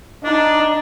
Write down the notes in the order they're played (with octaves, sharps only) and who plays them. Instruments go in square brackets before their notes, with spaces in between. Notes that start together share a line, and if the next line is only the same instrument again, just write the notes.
[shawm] D4 [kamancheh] D#4